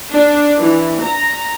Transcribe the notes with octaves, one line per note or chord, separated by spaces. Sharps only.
D4
E3
A#5